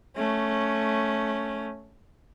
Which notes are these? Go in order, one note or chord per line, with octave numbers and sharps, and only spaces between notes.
A3 C#4